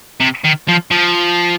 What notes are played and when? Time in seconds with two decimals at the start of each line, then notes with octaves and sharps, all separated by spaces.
0.20 C3
0.44 D#3
0.68 F3
0.91 F3